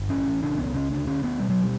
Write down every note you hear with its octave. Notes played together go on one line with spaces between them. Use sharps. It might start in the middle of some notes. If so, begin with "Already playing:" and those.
Already playing: G1
A1 C#4
A1
C#3 D4
C#2 B3
C#3 C#4
D2 D4
D3 C#4
D2 B3
B2 G3
F#3
G3